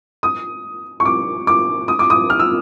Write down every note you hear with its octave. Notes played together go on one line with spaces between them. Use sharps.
D#6
C#6
D6
D6
D#6
D6
D#6
F6
E6